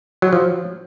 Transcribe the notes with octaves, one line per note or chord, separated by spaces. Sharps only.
F#3
F3